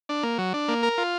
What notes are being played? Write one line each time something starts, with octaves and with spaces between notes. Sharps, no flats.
D4
A#3
F#3
D4
A#3
A#4
F4